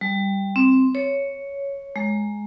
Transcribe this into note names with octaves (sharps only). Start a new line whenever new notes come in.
G3
C4
C#5
G#3